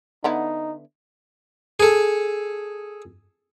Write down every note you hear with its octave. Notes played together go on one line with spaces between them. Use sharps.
D3 B3 D#4 E4
G#4 A4